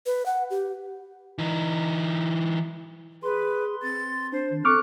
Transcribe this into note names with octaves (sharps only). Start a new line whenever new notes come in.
B4
F#5
G4
E3 D#4
G#4 B4 C6
C4 A6
D4 C5
D#3
C4 A4 C#6 D6 F6 F#6